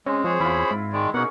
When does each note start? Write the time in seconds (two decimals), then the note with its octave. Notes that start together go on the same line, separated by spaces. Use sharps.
0.06 G#3 C4 C#4
0.24 F3 G#4 C5 C#5
0.40 E2 E4 F4 B5
0.71 G#2
0.93 D#3 G#3 D5
1.14 B2 A#3 C#4 D#4 G#4 F#5